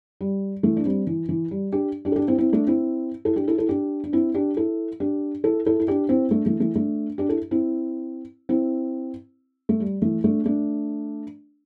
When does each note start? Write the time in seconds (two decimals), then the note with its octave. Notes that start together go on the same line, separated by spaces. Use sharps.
0.21 G3
0.63 E3 A3
0.77 D4
0.86 G3 C4
1.07 E3
1.29 E3
1.51 G3
1.72 D4 G4
2.05 D4 G4
2.12 A4
2.16 D4 G4
2.28 C4 E4
2.38 C4 E4
2.53 A3 D4
2.67 C4 E4
3.25 E4 A4
3.36 D4 G4
3.48 E4 A4
3.58 E4 A4
3.69 D4 G4
4.04 D4
4.13 C4 E4
4.34 D4 G4
4.57 E4 A4
5.00 D4 G4
5.44 E4 A4
5.66 E4 A4
5.79 E4
5.88 D4 G4
6.09 C4 E4
6.31 A3 D4
6.46 E3 A3
6.60 E3 A3
6.76 A3 D4
7.18 D4 G4
7.29 E4 A4
7.51 C4 E4
8.49 C4 E4
9.69 A3
9.80 G3
10.02 E3 A3
10.24 A3 D4
10.46 A3 D4